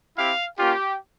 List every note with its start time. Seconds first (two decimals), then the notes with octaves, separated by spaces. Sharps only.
0.17 C4 E4 G4 F5
0.58 A#3 C#4 F4 G4